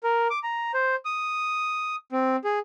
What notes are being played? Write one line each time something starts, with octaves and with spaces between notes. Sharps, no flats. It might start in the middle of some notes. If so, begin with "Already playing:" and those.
A#4
D6
A#5
C5
D#6
C4
G#4